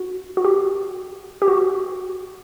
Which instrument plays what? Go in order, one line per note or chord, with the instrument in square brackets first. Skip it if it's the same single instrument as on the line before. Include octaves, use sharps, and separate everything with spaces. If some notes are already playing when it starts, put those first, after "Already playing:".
Already playing: [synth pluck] F#4
F#4
G4
G4
F#4